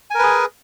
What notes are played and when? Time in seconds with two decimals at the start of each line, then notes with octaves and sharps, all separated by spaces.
0.11 G#5
0.15 A#4
0.19 B4
0.23 G#4